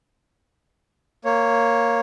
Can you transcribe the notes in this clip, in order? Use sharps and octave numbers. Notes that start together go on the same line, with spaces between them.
A#3 C#5